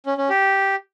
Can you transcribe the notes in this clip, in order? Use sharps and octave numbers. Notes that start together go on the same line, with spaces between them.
C#4
C#4
G4